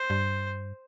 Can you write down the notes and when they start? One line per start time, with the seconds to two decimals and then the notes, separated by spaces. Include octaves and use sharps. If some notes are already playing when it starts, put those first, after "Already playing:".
Already playing: C5
0.10 G2